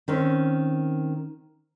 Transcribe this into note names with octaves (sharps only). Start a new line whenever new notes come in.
D#3 C4 C#4